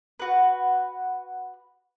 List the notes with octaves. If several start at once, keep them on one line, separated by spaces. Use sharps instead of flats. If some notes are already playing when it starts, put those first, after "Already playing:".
F#4 B4